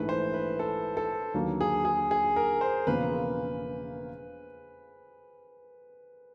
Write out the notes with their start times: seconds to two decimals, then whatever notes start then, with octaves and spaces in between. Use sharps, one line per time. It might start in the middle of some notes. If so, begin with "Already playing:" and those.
Already playing: A#1 G#2 E3 A3 B4
0.09 C5
0.34 B4
0.59 A4
0.97 A4
1.34 D#2 D3 F#3 A#3
1.61 G#4
1.85 G#4
2.11 G#4
2.36 A#4
2.61 C5
2.86 E1 E2 C#3 F3 A#3 B4